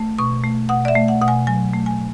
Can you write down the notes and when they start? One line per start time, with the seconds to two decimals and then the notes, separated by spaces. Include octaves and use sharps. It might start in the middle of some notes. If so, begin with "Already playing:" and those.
Already playing: A3
0.19 B2 C#6
0.44 A3
0.69 B2 F#5
0.85 D5
0.88 E5
0.95 A3
1.08 F#5
1.21 B2 F#5
1.28 G#5
1.47 F#3 G#5
1.73 A3
1.86 G#5